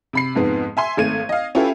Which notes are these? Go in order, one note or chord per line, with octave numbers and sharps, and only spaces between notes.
C3 B5 C7
F2 G#2 B3
E5 G#5 C6
G#1 A3 G#6 D#7
D#5 F5
C#4 E4 F4 G4 A4 B4